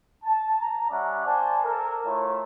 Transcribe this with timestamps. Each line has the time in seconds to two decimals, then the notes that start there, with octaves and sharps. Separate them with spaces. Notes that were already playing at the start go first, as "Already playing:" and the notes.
0.24 A5
0.60 A#5
0.90 G3 C#4 D5 E5 F#5
1.26 C5 D5 G#5 A5
1.63 A4 A#4
2.05 A3 E4 F4 C#5